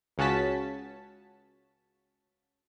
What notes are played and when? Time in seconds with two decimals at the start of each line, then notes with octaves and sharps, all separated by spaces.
0.18 C#2 C#3 C#4 F#4 A5 B6